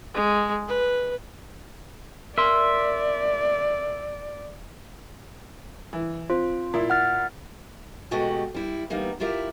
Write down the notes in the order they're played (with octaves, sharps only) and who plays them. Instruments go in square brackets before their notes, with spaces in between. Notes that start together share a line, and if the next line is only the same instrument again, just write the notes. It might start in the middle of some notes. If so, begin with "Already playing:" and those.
[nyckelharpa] G#3
B4
[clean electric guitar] A#4 C6 [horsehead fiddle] D5 [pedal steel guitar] E5
[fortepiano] E3
[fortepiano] C4 [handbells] F4
[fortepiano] A#2 E4
[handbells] F#5 F6 A6
[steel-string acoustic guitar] B2 G#3 A3 F#4 G4
G3 E4
E3 G3 A#3 B3 D#4
E4 F4 G4 A#4 E5